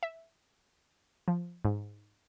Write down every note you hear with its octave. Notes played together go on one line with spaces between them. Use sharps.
E5
F3
G#2